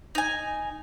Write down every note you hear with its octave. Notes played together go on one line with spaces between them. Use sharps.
D#4 G#5